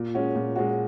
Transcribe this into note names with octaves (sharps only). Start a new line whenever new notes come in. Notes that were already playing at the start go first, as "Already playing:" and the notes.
Already playing: A#2
G#3 C#4 F#4
A#2
G#3 C#4 F#4